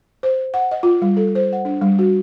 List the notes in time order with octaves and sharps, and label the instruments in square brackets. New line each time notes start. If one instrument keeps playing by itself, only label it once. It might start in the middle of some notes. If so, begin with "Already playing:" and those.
[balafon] C5
F#5
D#5
F4
G3
A4
C5
F#5
D4
G3
F#4